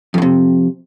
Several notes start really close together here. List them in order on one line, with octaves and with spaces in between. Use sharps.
F2 A2 C3